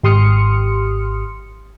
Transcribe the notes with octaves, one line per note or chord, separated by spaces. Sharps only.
G#1 G4 C6 D#6 F6 C#7